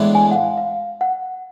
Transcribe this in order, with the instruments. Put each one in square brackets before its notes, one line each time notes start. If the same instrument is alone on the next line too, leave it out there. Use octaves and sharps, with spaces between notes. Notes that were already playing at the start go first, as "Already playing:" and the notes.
Already playing: [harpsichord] A2 E3 G#3 B3 D4
[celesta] G#5
F#5
F5
F5
F#5